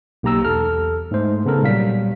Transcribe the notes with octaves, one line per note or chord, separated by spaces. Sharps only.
B1 A#3 G4 A#5 E6
E2 A4 F6
G#2 A3 C5
C#3 B3 A4 A#4
A#2 F#3 G3 F5 B6